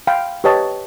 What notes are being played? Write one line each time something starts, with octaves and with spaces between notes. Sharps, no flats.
F5 G5 B5
G4 B4 C#5 D#5 A5